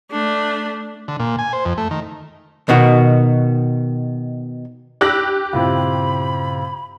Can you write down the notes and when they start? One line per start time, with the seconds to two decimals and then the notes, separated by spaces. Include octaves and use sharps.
0.12 A3 D4
1.08 D3
1.20 A#2
1.39 G#5
1.53 C5
1.65 F2
1.78 A3
1.91 D#3
2.69 B2 D#3 F#4
5.01 D4 G4 B5 D6 E6 F#6 A#6
5.53 G2 A#2 C#3 C4 E4 F4 B5